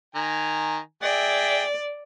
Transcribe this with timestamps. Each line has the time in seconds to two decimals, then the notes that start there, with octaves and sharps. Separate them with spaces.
0.15 D#3 G#5 A#5
1.02 G#4 D5 E5 G5